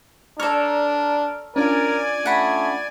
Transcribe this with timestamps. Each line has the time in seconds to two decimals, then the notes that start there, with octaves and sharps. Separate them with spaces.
0.40 D4 A4 C#5 D5 A#5 F6
1.56 C#4 D4 F4 A#4 D5 G#5
2.26 A3 F#5 B5